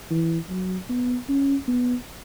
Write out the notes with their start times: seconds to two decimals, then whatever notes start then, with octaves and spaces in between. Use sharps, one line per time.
0.10 E3
0.49 F#3
0.89 B3
1.28 C#4
1.68 B3